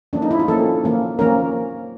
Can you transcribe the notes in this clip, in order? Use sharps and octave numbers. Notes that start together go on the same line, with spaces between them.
F3 A#3 C#4 D4
D#4
E4
F4
F3 A#3 C#4 A4
F3 A#3 C#4
F3 A#3 C#4 A#4